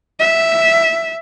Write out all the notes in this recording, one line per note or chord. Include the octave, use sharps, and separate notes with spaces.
E5